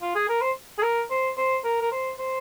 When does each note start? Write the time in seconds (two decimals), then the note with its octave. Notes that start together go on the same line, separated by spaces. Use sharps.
0.01 F4
0.15 G#4
0.29 A#4
0.42 C5
0.78 G#4
0.83 A#4
1.10 C5
1.37 C5
1.64 A#4
1.81 A#4
1.92 C5
2.19 C5